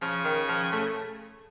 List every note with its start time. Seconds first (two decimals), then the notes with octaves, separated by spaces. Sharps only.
0.02 C#3 F3
0.25 D#3
0.49 F3
0.72 A3